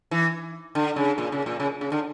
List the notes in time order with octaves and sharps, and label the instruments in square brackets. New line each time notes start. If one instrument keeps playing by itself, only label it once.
[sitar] E3
D3
C#3
A#2
C#3
A#2
C#3
C#3
D3